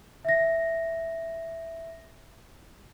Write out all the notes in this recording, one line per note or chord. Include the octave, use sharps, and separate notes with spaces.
E5 A#6